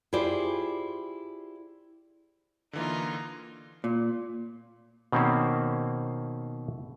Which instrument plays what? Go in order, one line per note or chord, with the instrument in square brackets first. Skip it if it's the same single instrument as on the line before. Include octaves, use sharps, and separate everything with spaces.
[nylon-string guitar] E4 F4 G4 G#4 C5 D5
[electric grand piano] D3 E3 A#3 [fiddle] D#4 F4
[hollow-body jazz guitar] A#2
[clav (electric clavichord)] B2 D#3 A#3 C4 C#4 C5